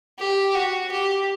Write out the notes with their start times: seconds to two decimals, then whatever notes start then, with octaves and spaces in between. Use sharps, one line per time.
0.19 G4
0.55 F#4
0.92 G4